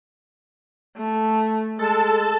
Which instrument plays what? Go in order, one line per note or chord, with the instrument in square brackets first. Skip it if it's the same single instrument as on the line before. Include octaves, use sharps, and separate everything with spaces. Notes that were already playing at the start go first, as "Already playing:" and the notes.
[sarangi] A3
[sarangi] G#3 [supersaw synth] A4 A5